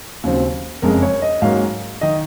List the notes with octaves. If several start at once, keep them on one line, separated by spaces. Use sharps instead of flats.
D#2 C#3 F#3 C4
F#1 F2 C#3 G#3 A#4
C#5
D#5
G#2 F#3 A#3 C#4 F5
D#3 D#5